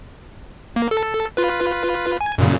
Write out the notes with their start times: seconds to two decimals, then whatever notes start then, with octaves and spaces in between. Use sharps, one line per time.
0.76 A#3
0.91 A4
1.37 F4 B4
2.21 G#5
2.38 F#2 A#2 C#3